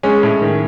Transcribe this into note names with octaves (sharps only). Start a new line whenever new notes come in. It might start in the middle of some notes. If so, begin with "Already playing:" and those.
G#3 C#4
A2
D#3